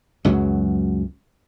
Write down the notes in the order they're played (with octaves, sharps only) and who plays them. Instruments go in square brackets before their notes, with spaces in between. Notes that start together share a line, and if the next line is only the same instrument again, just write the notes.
[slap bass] C#2 F#2 F#3